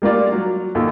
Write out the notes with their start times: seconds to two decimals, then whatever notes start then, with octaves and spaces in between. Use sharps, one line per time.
0.02 G3 A#3 F4 D5
0.32 F#3
0.75 D#2 F4 A4